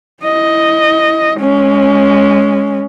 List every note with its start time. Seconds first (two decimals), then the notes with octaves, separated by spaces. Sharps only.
0.23 E4 D#5
1.38 G#3 C#4